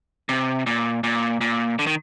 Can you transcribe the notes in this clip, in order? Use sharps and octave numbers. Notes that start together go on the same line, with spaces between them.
C3
A#2
A#2
A#2
D3
D#3